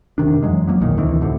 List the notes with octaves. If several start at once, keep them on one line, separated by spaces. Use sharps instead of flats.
F1 C3 D#3 D4
F#2 E3 F#3 G#3
F3 F#3 A#3 B3
B1 E2 A#2 D#3
D2 C3 D#3 E3
D2 A2 C3